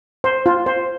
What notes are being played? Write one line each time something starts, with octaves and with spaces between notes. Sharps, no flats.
C5
F4
C5